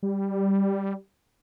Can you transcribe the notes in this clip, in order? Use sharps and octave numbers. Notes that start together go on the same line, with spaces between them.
G3